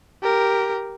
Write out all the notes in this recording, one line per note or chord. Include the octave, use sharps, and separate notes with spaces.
G4 A#4